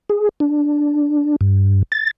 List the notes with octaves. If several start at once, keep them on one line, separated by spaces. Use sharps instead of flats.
G#4
D4
G2
A6